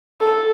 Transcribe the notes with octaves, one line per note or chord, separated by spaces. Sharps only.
A4